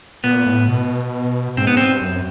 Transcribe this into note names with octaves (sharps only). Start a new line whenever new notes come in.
A#2 B3
A2
B2
G#2 C4
B3
G2 C4
F#2